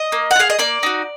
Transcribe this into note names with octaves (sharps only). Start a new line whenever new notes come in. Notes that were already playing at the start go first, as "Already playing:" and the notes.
Already playing: D#5
A#3
F#5
F4
G#4 F5
D#5
A#3 D5
D#4 F#4